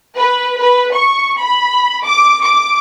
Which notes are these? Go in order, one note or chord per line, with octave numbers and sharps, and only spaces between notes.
B4
B4
C#6
B5
D6
D6